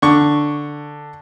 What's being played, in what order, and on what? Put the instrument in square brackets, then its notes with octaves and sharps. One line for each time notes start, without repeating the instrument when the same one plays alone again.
[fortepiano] D3 C#6